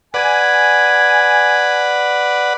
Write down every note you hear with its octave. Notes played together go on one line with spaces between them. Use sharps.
B4 D5 F#5 G#5